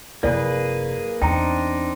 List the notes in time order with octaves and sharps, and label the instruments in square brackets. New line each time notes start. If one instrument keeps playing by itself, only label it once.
[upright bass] F1 F#2 [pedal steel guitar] A#3 G#4 B4 [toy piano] E4 D5
[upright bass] E2 [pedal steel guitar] C4 D4 D#4 [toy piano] G5 A#5